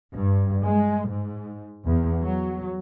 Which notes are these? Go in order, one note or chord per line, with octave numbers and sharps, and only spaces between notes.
G2
G#3
G#2
E2
F#3